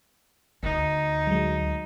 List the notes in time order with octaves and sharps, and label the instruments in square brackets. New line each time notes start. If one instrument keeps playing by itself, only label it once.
[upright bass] D2 [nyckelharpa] D#4
[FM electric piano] F#3 G#3